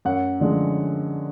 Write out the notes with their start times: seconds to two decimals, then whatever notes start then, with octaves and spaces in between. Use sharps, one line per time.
0.05 F#2 F#5
0.40 D3 F3 G#3